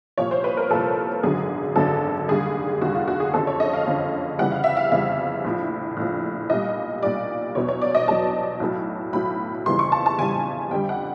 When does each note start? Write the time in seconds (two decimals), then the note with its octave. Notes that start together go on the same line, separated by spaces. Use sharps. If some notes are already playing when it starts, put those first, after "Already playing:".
0.18 C2 A#2 F3 C#5
0.31 C5
0.44 B4
0.57 A#4
0.70 C2 A#2 F3 A4
1.23 G#1 F#2 D3 F#3 G#4
1.76 G#1 F#2 D3 F#3 A4
2.28 F1 D#2 D3 G3 G#4
2.81 F1 D#2 D3 G3 F#4
2.94 F4
3.07 F#4
3.20 G#4
3.34 F#1 F2 D3 F3 A4
3.47 C#5
3.60 D#5
3.74 F5
3.87 F#1 F2 D3 F3
4.39 F2 C#3 E3 G3 F#5
4.52 F5
4.64 E5
4.77 F5
4.92 F2 C#3 E3 G3 E5
5.45 A#1 A2 F3
5.97 A#1 A2 F3
6.50 B1 A#2 G3 D#5
7.03 B1 A#2 G3 D5
7.55 E2 B2 F#3 C#5
7.69 C#5
7.81 D5
7.95 D#5
8.08 E2 B2 F#3 A5
8.60 B1 A2 F#3
9.13 B1 A2 F#3 B5
9.66 F2 C#3 E3 G3 C6
9.79 C#6
9.92 A5
10.06 A5
10.18 F2 C#3 E3 G3 G#5
10.71 F2 D3 G3 G5
10.89 F#5